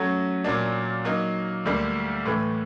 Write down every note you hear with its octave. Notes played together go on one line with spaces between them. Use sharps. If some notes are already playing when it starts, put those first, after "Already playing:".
Already playing: F#3 A3 C#4 F#4
A#2 F#3 A#3 D4
F#3 A#3 D#4
D2 D3 G3 A#3
A2 E3 A3